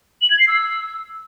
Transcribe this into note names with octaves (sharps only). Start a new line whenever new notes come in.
F#7
G#6
C7
E6